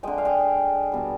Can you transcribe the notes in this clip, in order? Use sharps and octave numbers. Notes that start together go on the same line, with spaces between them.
D3 G#3 D#5 G5
F5
D#5 G5
B2 G3